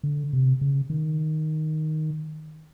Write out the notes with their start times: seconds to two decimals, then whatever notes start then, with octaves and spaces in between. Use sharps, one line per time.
0.03 D3
0.33 C3
0.61 C#3
0.90 D#3